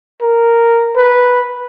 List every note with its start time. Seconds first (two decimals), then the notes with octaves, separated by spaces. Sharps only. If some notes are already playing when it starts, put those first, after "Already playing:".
0.22 A#4
0.96 B4